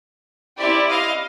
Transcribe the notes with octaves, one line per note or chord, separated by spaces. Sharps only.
C4 E4 G4 D5 E5
D#5 F5